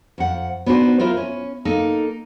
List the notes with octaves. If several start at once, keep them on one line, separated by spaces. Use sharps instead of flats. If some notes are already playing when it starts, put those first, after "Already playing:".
F2 F#5
B3 D4 D#4 F#4 C5
E4 F4 A#4 C5
C#4
A#3 D#4 A4